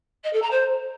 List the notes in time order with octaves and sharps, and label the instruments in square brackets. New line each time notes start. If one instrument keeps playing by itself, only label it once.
[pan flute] D#5
A4
A#5
C5